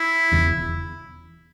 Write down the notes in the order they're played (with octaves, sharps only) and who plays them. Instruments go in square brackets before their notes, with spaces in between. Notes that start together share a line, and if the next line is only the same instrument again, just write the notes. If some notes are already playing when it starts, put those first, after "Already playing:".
Already playing: [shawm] E4
[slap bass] E1 E2 C#3